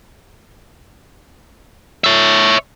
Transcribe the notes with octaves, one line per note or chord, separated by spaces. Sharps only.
C#5 E5